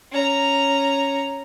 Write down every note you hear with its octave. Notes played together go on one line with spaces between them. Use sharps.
C#4 A#5